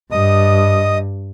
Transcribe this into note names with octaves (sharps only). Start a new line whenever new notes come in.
G2 D#5 D#6